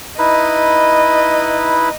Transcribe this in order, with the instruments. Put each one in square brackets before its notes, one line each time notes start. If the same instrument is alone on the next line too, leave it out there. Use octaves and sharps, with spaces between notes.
[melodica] D#4 E4 B4 [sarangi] D#5